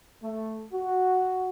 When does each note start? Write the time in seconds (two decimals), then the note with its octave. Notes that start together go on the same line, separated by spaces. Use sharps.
0.22 A3
0.73 F#4